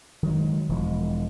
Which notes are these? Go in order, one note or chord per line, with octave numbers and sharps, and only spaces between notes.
D#3 F#3 G#3
E1 E3 F3 G#3